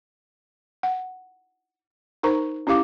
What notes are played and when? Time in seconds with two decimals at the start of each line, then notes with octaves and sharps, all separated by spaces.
0.83 F#5
2.23 D#4 A#4 C5 A#5 C#6
2.67 C#4 E4 G4 F5 D6